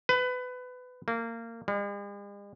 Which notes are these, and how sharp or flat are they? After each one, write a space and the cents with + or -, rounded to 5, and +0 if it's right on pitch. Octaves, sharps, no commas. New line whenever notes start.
B4 +25
A#3 -25
G#3 -45